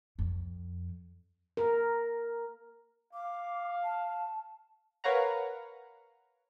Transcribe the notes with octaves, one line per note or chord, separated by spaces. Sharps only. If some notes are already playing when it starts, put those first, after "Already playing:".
F2
A#4
F5 D6
A5
A#4 B4 C#5 F5 F#5 A#5